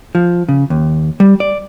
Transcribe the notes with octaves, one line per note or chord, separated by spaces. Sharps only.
F3
C#3
D#2
G3
D5